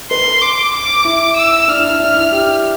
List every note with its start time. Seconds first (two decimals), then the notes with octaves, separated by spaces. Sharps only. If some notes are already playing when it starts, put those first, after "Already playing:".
0.11 B4 C6
0.42 D6
0.73 D6
1.05 E4
1.37 E6
1.68 D4 F6
1.79 E4
1.90 E4
2.00 D4
2.16 E4
2.32 G4